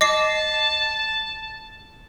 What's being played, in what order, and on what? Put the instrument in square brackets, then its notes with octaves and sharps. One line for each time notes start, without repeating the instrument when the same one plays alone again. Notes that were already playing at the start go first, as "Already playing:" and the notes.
[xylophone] D#5 D6 C7 [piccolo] A5